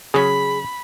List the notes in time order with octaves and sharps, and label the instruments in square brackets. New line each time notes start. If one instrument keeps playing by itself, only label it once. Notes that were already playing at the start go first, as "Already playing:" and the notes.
[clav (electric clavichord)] C#3 F#3 C#4 [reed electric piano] G#4 [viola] B5